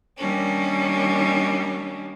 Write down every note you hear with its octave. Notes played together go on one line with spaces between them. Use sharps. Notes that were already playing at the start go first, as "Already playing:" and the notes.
D#3 G3 A#3 C#4 D4